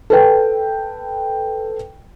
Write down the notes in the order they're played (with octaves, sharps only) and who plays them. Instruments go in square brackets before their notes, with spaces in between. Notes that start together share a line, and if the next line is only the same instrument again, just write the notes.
[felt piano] A4 B4 G5